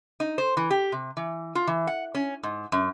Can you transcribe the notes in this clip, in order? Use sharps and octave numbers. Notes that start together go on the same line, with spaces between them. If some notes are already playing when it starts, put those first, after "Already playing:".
D#4
C5
E3
G4
C3
E3
F4
E3
F#5
C#4
G#2
F#2